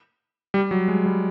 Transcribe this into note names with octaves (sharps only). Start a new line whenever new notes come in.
G3
F#3
G#3
G3